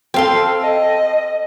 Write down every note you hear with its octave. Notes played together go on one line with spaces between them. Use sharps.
C4 A4 F5 G5 C6
D#5